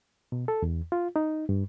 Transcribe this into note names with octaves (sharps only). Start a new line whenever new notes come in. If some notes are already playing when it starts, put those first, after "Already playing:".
B2
A4
E2
F4
D#4
G2